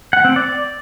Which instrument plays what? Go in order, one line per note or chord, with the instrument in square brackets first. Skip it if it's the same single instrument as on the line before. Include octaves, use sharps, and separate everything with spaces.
[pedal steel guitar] F#5
C4
D5